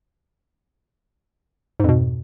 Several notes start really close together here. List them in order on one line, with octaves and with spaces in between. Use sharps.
G#2 F2 B2